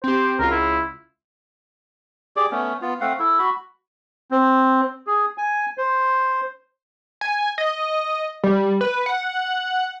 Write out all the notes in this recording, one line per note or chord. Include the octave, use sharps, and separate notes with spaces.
C4 G4 C5
C#2 F4 A#4
E4
G4 G#4 D5 D6
A3 B3 C#4
B3 F4
A3 C4 F5 F#5
E4 A4
F#4 B5
C4
G#4
G#5
C5
G#5
D#5
G3
B4
F#5